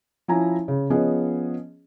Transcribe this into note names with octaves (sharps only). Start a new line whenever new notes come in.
F3 C#4 E4 G#5 A#5
C#3
F3 B3 C#4 G#4 C#5 D#5